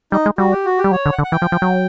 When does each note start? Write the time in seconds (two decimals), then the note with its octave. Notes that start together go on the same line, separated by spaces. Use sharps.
0.12 G3 D#4
0.26 G#3
0.38 G3 F#4
0.52 G4
0.65 F#4
0.78 G4
0.84 G3
0.91 F#3 C#5
1.06 D3
1.12 F#5
1.19 D3
1.24 F#5
1.32 E3 G5
1.42 F3
1.52 F3
1.62 F#3